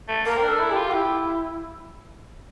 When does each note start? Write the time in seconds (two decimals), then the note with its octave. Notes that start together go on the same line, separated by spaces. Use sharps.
0.08 A3
0.26 A#3 A#4
0.38 C4
0.43 D4
0.48 A4
0.60 E4
0.71 G4
0.76 F4
0.93 E4 G4